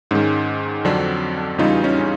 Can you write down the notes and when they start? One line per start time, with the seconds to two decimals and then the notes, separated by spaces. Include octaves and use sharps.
0.11 G#2 D#3 G#3 C#4
0.85 F2 D3 F#3 C4 D4
1.58 E2 C#3 E3 G3 D#4 F4
1.84 C#4 D#4
2.00 C#4